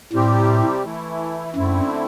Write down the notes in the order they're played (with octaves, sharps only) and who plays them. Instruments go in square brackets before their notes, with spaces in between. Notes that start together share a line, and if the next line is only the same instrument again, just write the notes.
[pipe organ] A2 [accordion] C3 G3 C4 G4
[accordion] E3 A3 E4
[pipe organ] F#2 [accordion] D3 A3 C4 E4